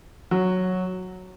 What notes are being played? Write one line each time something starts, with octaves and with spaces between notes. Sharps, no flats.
F#3